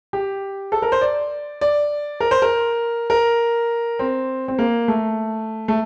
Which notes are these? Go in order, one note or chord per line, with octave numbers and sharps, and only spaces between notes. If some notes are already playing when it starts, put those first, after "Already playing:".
G4
A4
A#4
C5
D5
D5
A#4
C5
A#4
A#4
C4
C4
A#3
A3
A3